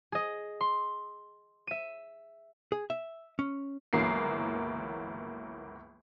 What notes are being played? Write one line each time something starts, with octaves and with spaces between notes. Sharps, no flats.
G#4 D#5
C6
E5 D#7
G#4
E5
C#4
G1 C#2 E3 F#3 A#3 C7